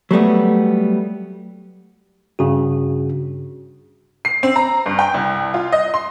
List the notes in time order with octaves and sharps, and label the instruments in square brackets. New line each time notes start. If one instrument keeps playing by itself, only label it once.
[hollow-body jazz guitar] F#3 G3 A3 B3
[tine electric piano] G2 C#3 F#4
[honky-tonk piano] C7
C4
A#5
G2
G5
C2
F4
D#5
C6